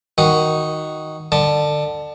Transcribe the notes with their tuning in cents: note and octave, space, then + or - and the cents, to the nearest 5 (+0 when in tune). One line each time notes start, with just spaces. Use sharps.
D#3 +0 F#4 +0
D3 +25 A5 +0